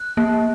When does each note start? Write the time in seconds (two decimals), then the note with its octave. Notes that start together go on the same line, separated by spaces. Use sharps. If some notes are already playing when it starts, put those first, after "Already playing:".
Already playing: F#6
0.17 A#3